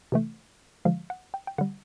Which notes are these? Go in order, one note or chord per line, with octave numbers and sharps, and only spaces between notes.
C3 E3 A3
D3 F3 G#3 F5
F#5
G5
G5
D3 G3 F#5